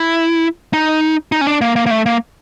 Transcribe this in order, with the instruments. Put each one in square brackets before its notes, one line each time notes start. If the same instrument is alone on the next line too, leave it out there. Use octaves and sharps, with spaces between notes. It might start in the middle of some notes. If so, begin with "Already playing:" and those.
Already playing: [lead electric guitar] E4
D#4
D#4
C#4
D4
A#3
A#3
A#3
A3
A#3